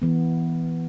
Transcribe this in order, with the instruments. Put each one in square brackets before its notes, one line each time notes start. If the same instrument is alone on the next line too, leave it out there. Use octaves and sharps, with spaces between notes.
[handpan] E3 B3